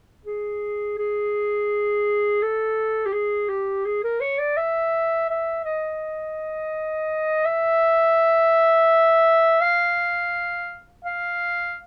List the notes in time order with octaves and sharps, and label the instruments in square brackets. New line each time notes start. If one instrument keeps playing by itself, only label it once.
[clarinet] G#4
G#4
A4
G4
G#4
G4
G#4
A#4
C#5
D5
E5
E5
D#5
E5
F5
F5